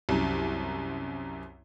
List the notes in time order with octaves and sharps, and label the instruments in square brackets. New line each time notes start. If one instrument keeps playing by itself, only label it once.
[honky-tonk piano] C2 F#2